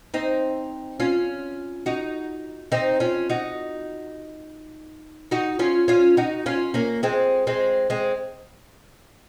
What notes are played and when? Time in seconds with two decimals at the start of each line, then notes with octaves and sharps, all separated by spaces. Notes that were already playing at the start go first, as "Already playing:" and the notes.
0.14 C4 D#4
1.00 C#4 F4
1.86 D#4 F#4
2.72 C4 D#4
3.00 C#4 F4
3.30 D#4 F#4
5.31 D#4 F#4
5.59 C#4 F4
5.88 C#4 F4
6.17 D#4 F#4
6.46 C#4 F4
6.74 A#3 C#4
7.03 G#3 C4
7.47 G#3 C4
7.90 G#3 C4